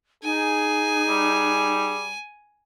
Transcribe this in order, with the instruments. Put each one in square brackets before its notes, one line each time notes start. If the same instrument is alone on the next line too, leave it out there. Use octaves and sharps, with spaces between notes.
[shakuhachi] D#4 [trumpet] G#4 [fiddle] G#5
[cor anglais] G3